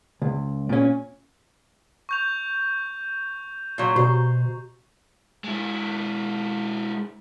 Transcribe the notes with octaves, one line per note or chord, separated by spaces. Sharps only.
C#2
A#2 C#4
C#6 G6 F7
A#2 F#3
B2 F#4 G4 C5 A#5
G#3 E4